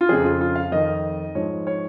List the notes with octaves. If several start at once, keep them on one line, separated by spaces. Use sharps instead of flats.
F4
F2 C#3 F3 G#4
F4
F4
F5
F2 D#3 D#5
G#2 F3 C#5
C#5